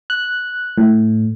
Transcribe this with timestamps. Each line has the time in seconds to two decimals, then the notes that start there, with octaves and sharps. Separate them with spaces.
0.10 F#6
0.78 A2